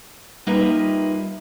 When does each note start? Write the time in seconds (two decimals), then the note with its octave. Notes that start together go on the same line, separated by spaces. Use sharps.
0.47 G3 A#3 D#4 F4 B4 E5